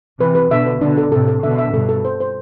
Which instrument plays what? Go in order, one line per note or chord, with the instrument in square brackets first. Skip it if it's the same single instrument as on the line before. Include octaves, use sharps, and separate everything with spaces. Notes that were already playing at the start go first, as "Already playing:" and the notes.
[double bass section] C3 E3 [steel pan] B4
[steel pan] B4
[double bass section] B2 D3 [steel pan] E5
[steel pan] B4
[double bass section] B2 D3 [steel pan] D4
[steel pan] A4
[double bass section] A2 C3 [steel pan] A4
[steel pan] A4
[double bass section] B2 D3 [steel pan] E5
[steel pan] E5
[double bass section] G2 B2 [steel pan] A4
[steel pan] A4
C5
C5